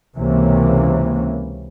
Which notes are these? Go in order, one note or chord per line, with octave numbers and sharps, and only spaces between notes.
C#2 C3 E3 A#3 C#4